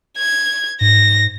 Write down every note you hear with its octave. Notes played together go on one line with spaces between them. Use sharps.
G#6
G#2 A#6